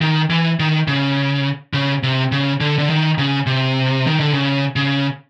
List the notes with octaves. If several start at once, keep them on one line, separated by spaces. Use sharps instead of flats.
D#3
E3
D#3
C#3
C#3
C3
C#3
D3
D3
D#3
C#3
C3
D#3
D3
C#3
C#3